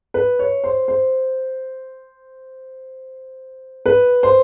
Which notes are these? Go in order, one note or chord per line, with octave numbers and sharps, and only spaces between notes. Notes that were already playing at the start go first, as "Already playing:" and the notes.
B4
C#5
C5
C5
B4
C5